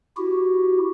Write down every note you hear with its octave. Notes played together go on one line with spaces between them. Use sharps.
E4 F#4 G4